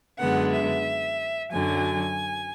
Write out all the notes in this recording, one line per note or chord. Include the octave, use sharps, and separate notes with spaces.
F#2 D3 G#3 B3 F#5
E5
F#2 D3 F#3 G#5